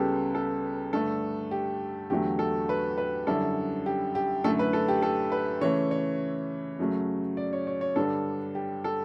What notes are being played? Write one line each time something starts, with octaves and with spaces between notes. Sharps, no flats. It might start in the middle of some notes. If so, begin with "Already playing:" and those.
Already playing: C#2 C#3 G3 B3 G4 A4
A4
G2 D3 A3 D4 A4
G4
E2 D3 F#3 A3 G4
A4
B4
B4
F#2 D3 G3 C#4 E4 A4
G4
G4
F#2 D3 A3 E4 A4
B4
A4
G4
A4
B4
C#3 E3 A3 C#5
C#5
F#2 C#3 F#3 A3
D5
C#5
C#5
C#5
G2 D3 G3 D4 A4
G4
A4